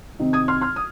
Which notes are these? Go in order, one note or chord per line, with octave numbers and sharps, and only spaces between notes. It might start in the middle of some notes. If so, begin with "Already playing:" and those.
C3 D#3 C4 D#4
D#6 G#6
C6 F6
C6 F6
D#6